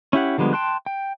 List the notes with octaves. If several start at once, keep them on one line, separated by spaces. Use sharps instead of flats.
C#4 E4 G4 F#5
D3 F3 G3 G#3 B3
G5 A5 C6 F#6
G5